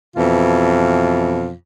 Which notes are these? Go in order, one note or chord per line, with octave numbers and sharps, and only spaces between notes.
F2 B2 E3 F4